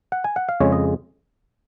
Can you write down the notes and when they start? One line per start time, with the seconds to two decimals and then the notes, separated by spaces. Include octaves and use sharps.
0.12 F#5
0.24 G#5
0.36 F#5
0.49 F5
0.60 F2 C#3 G#3 C#5
0.72 D#5